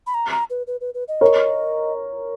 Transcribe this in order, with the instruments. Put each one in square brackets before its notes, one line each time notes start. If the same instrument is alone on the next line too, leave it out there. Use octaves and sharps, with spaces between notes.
[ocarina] B5
A#5
A#5
B4
B4
B4
B4
D#5
[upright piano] A#4 C#5